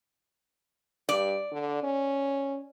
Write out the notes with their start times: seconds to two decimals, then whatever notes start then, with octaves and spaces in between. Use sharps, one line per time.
1.09 G2 D5
1.52 D3
1.83 C#4